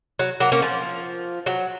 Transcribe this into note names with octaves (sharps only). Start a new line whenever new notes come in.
F#3
F#3 A#3
A#3 C#4
F3
F#3